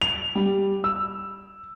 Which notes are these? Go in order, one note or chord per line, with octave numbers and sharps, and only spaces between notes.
F7
G3
E6